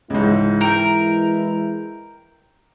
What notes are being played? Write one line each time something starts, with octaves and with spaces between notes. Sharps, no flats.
C#2 G#2 E3 G#3 E4
A#4 G5 A#5